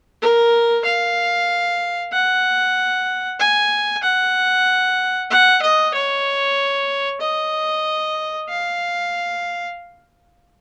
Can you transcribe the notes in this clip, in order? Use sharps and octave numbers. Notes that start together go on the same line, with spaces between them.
A#4
F5
F#5
G#5
F#5
F#5
D#5
C#5
D#5
F5